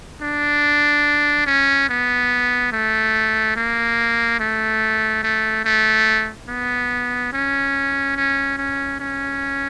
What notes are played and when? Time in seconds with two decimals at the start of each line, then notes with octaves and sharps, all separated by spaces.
0.22 D4
1.46 C#4
1.89 B3
2.72 A3
3.56 A#3
4.40 A3
5.23 A3
5.65 A3
6.48 B3
7.33 C#4
8.16 C#4
8.57 C#4
9.00 C#4